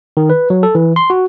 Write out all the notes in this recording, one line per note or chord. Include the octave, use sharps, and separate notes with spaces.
D#3
B4
F#3
A4
E3
C6
F#4